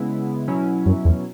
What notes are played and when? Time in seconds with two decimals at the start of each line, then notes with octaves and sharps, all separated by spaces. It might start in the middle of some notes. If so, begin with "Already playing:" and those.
Already playing: C#3 G#3 B3 E4
0.48 B2 F#3 C#4 E4
0.86 F#2
1.05 E2